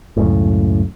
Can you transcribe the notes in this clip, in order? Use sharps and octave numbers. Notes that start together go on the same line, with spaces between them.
C#2 F#2 A2